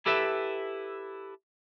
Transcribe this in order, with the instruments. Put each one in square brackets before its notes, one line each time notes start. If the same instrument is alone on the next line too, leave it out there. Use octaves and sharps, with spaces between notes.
[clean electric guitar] E4 G4 A4 B4 E5